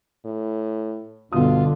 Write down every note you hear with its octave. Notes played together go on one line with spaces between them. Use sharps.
A2
G1 B2 D3 F4 D#6